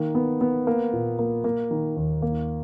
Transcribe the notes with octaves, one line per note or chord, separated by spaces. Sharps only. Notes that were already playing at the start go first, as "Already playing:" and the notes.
Already playing: D#3 A#3
B3
B3
A#3
A#2
A#3
A#3
D#3
D#2
A#3